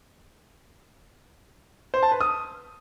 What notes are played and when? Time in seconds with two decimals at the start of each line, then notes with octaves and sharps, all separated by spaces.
1.94 C5
2.03 A5
2.12 B4
2.20 D#6